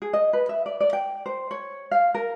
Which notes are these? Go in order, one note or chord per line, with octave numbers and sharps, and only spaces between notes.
G#4
D#5
B4
E5
D5
D5
G5
C5
C#5
F5
A#4